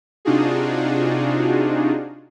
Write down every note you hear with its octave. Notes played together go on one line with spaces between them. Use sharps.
C3 D4 D#4 F4 F#4 G#4